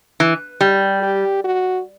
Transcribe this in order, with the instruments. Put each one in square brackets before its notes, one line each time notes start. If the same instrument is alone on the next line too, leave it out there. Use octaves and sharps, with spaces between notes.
[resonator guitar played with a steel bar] E3
[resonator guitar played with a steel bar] G3 [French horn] G4
[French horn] G4
F#4